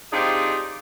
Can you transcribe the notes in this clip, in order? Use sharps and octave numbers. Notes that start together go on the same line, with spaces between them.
C4 D4 D#4 F4 G4 G#4